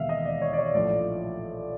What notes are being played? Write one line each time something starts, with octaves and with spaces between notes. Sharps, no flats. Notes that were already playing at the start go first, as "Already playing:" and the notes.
Already playing: E1 D#2 D#3 G#3 B3 E5 F5
D#5
D5
C#5
D5
C#5
A#1 A2 F3 D5